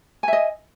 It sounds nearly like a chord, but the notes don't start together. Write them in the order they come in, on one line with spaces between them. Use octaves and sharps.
G#5 E5 D#5